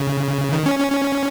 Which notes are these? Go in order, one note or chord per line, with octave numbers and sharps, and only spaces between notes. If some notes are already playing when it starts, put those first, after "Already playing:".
Already playing: C#3
D#3
C#4
C#4
C#4